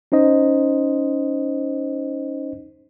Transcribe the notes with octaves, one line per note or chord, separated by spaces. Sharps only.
C#4 D#4 C5 D#5